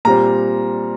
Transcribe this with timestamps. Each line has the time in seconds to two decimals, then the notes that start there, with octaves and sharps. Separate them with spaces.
0.05 A#2 G3 C4 A#5